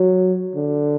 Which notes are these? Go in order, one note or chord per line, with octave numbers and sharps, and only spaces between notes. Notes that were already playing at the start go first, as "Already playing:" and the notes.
Already playing: F#3
D3